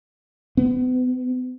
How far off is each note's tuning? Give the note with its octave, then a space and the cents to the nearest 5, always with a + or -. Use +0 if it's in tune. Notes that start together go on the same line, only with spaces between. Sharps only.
B3 +40